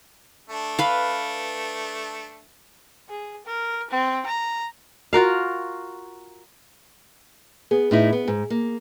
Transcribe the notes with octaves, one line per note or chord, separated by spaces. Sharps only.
A3 D4
B4 F5
G#4
A#4
C4
A#5
F4 F#4 A#4 F5
B3 G#4
A2 D#4 E4
B3
G#2
A#3